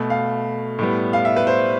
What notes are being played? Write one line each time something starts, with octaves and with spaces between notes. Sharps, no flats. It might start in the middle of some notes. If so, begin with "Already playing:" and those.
Already playing: B2 A3
F5
A2 G3 B3
F5
E5
B4
C5